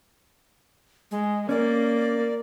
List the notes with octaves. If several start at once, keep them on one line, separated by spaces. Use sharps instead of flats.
G#3
A#3 C#4 D5